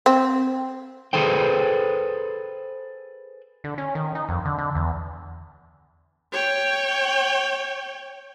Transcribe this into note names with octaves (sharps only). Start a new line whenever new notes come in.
C4
G#4 A4 B4 C5 G5
D3
C#4
D#3
D#4
F2
D3
D3
E2
C#5 G5